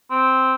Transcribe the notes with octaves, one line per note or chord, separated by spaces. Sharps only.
C4